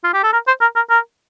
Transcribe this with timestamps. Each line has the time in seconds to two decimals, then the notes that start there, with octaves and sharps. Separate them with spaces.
0.04 F4
0.14 G4
0.23 A4
0.33 A#4
0.47 C5
0.61 A#4
0.76 A#4
0.90 A#4